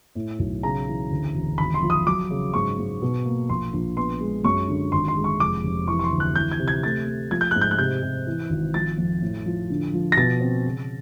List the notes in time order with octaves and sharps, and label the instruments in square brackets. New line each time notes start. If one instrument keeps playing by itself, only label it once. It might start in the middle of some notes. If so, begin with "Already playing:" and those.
[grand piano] A2
B1
C#3 A#5
E3
D2
E1
G#1 B5
C6
F3
D#6
F#3 D6
C#3
G#2 C#6
G#2
B2
A#3
A#1 C6
A#1
B3 C6
G#3
F#2 C#6
D3
G#1 C6
C6
G#3
C#6
F1 D6
F1
E3 C#6
C#6
C6
D2
F#6
E3 G6
G#6
C3
G#6
A3 A6
A3
F3 G#6
G6
G#2 F#6
G6
F#6
C3 G6
C3
E3
G#1
F3 A6
F2
A2
F3
D3
F3
A#6
B2 A6
C4
C#3